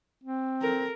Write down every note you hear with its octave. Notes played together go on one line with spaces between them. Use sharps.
C4
A4 A#4